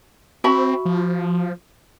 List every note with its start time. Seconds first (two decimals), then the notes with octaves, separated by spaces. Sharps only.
0.44 C4 F#4 E5 B5
0.85 F3